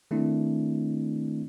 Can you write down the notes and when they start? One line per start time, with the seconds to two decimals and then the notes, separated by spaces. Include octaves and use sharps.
0.11 D#3 A3 C4 D4 E4